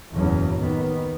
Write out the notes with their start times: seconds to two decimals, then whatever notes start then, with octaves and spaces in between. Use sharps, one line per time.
0.13 F#1 E2 A2 C#3 F#3 C#4
0.58 D#2 D#3 B3